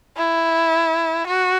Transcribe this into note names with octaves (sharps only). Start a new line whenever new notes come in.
E4
F#4